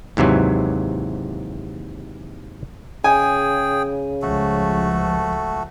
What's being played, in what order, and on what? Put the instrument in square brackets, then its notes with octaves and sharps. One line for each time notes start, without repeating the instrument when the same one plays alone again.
[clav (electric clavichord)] D#2 G#2 C3 E3 F#3
[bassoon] C#3 [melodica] G#4 G5 [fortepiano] G#5
[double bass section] C#2 F3 [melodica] A3 F#4 A4